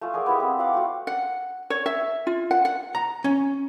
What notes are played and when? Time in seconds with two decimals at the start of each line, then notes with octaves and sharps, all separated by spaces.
0.01 A3 F4 G#5
0.14 G#4 A#4 D5 F#5
0.26 B3 E4 G4
0.40 C4
0.58 F4 F5 F#5 D6
0.74 A3 F#4
1.07 F#5
1.70 C#5
1.86 E5
2.27 F4
2.51 F#5
2.65 F#5
2.95 A#5
3.24 C#4